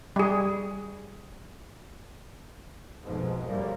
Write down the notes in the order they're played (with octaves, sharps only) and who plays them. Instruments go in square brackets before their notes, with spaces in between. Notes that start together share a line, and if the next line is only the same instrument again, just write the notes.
[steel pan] G3 G#4
[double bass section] B1 F2 G#2 B2 F3 G#3
G1 F#2 A2 F3 G3 A#3